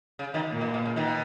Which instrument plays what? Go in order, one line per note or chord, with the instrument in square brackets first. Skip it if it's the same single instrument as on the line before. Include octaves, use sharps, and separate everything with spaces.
[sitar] C#3
B2 D#3
[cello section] A#2 A#3
[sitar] B2
B2
C#3
B2 D#3